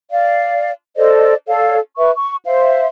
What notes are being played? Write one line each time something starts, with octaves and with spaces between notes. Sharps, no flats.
D5 F5
A4 C5 D5 D#5
A4 C#5 D5 F5
B4 E5 C#6
C#6
C5 E5 F5